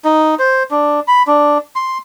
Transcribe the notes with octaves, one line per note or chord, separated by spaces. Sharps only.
D#4
C5
D4
B5
D4
C6